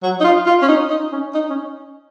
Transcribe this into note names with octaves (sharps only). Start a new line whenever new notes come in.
F#3
D#4
F4
F4
C#4
D#4
D#4
C#4
D#4
C#4